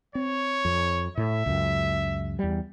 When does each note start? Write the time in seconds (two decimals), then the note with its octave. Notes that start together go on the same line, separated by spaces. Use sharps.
0.15 C4 C#5
0.65 F2
1.17 A2 E5
1.46 C#2 F#2
2.39 E2 G3